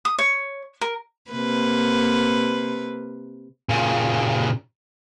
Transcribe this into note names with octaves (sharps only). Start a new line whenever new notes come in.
D#6
C#5
A#4
C3 A#3 B4
A#2 C#3